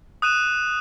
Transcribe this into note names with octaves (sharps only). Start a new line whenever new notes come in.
D#6 F#6 D#7 E7